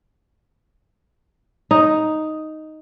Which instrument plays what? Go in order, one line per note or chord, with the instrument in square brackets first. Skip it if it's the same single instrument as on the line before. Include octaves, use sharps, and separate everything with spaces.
[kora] D#4